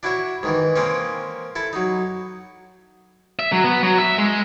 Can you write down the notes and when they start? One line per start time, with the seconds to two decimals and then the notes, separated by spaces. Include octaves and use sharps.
0.03 D4 E4 F#4 C#5 E5
0.43 G#2 D#3 E3
0.76 G#3 A#3 C4 C#4
1.56 E4 A4
1.73 F#3 D#4
3.39 E5
3.52 F#3
3.64 B3
3.83 F#3
3.98 E5
4.18 G#3